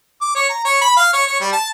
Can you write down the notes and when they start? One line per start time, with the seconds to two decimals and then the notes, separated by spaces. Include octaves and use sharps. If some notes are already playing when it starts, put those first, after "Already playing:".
0.21 D6
0.35 C#5
0.49 A#5
0.65 C#5
0.81 B5
0.96 F5
1.13 C#5
1.27 C#5
1.40 G3
1.52 A5